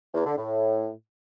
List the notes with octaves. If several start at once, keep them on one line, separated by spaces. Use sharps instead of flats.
E2
D3
A2